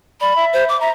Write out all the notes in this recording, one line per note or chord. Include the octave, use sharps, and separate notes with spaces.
D5 B5
E5
C5
D6
E5 A#5